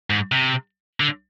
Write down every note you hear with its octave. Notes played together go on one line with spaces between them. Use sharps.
G#2
C3
D3